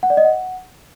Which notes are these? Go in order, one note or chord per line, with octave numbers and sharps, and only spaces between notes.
F#5
D5
D#5
F#5